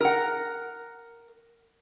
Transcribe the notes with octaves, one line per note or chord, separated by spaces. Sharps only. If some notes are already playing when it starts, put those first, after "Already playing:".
A#4 F#5